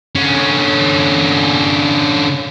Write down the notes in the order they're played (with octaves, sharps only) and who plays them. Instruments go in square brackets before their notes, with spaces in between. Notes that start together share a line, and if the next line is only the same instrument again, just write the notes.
[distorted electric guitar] D3 C#4